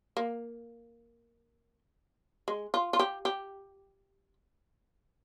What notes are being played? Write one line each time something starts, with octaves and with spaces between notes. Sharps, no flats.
A#3
G#3
F4
F4
G4
G4